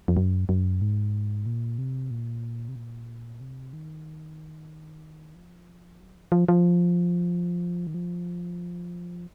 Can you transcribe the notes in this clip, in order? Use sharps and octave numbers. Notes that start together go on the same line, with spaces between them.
F2
F#2
F#2
G#2
A#2
C3
A#2
C3
A#2
C3
D#3
F3
F#3
F3
F3
F3
D#3
F3